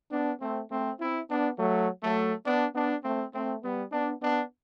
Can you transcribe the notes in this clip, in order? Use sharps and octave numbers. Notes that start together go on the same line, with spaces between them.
B3 D4
A3 C4
A3 C4
C4 E4
B3 D4
F#3 A3
F#3 A3
B3 D4
B3 D4
A3 C4
A3 C4
G3 B3
B3 D4
B3 D4